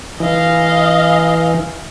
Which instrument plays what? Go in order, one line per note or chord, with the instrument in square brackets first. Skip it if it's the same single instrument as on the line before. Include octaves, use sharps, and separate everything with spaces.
[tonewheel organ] E3 [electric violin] D#5 F5